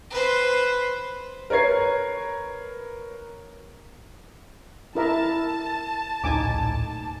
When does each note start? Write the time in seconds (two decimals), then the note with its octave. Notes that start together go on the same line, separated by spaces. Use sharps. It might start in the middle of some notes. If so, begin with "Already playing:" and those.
0.11 B4 C5
1.50 A#4 B4 C#5 G#6 C7
4.95 E4 A#4 E5 A5
6.24 D1 A#1 A2 D#4 G#5 D6